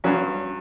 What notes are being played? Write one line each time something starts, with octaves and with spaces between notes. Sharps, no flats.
G2 F#3 C#4